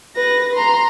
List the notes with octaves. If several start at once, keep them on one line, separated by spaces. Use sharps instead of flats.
B4 A#6
A#5 C6